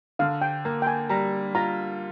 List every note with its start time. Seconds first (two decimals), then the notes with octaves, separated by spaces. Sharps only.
0.19 D3 F5
0.42 G5
0.65 A#3
0.82 G5
0.87 G#5
1.09 G3 A#5
1.55 F4 A#5